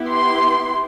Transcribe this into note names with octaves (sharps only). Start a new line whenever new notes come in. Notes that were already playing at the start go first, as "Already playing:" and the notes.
Already playing: B3 E4 G4
C6